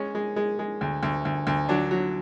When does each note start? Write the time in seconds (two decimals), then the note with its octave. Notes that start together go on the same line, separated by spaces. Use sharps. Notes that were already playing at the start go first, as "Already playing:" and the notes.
Already playing: G#3 C#4
0.15 G#3
0.36 G#3
0.59 G#3
0.81 D2
1.03 D2
1.25 D2
1.47 D2
1.69 F#3 D4
1.91 F#3